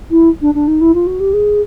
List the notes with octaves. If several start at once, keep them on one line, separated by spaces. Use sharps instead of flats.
E4
D4
D4
D#4
E4
F4
F#4
G4
G#4